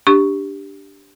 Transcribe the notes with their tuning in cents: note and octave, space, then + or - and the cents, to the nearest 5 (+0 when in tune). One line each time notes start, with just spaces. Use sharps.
D4 +0 G4 +0 C#6 +0